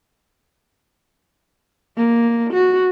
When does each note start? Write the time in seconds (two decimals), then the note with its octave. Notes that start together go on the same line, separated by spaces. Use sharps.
1.97 A#3
2.53 F#4